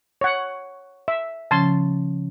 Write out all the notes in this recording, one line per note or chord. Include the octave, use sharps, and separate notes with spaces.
C#5 F#5
E5
C#3 F3 C#4 A5 C6